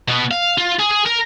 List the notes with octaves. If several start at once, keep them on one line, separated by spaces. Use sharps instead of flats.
B2 B3
F5
F4
G#4
G#4
A#4